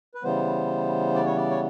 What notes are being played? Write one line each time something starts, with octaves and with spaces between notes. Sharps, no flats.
B4
C#3 E3 G3 B3 C5
D5
C#5
D5
C#5